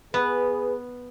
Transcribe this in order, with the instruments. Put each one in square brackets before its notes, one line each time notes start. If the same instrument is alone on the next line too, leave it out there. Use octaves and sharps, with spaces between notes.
[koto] B3 [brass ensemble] G#4 B4